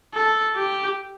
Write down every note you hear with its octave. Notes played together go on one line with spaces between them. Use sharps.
A4
G4